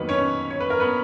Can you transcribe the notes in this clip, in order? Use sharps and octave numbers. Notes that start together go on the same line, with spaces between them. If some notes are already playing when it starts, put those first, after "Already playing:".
Already playing: F2 D#3 F#3 A#3 B3 B4
C#4 C#5
C#5
B4
A#4
B3 B4